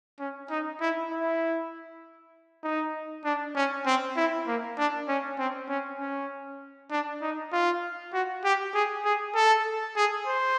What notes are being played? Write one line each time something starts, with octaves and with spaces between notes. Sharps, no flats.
C#4
D#4
E4
E4
D#4
D4
C#4
C4
E4
A#3
D4
C#4
C4
C#4
C#4
D4
D#4
F4
F#4
G4
G#4
G#4
A4
G#4
C5